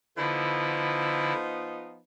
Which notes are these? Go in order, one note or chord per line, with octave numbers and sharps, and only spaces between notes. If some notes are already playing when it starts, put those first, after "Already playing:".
D3 F3 B3 D#4 E4